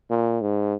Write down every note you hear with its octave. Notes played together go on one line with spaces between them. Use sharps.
A#2
G#2